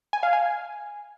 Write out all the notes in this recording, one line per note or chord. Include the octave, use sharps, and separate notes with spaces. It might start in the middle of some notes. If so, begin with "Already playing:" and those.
G#5
F5
G#5